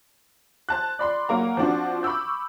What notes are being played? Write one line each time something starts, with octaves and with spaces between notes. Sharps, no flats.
C5 A5 F#6
D5 B5 C6
F#3 A#3 A#5
F3 C4 D4 F#4 C5
B5 C#6 D6 E6 G6